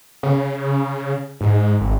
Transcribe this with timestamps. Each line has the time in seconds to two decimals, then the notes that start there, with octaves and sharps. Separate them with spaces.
0.23 C#3
1.41 G#2
1.81 G#1